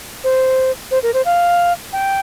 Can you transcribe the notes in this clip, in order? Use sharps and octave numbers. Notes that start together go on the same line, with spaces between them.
C5
C5
A#4
C5
F5
G5